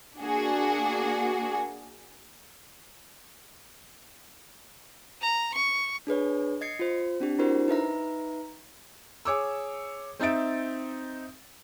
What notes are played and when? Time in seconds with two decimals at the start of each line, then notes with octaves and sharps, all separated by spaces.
0.20 A#3 D4 F#4 G#4
5.22 A#5
5.54 C#6
6.07 D4 G#4 B4 C#5
6.61 D#5 G#6 C7 C#7
6.79 F4 C5
7.20 C4 D4 G4
7.38 D4 E4 F#4 A#4 C5
7.68 D#4 B4 E5 A#5
9.25 G#4 C#5 D6 E6
10.20 C4 D#4 E5 A6 D7